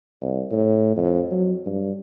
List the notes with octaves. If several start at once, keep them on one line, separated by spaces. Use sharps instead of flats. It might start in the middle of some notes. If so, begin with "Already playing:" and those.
C2
A2
F2
F#3
G2